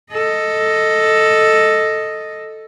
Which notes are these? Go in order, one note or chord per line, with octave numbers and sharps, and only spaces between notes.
A4 D#5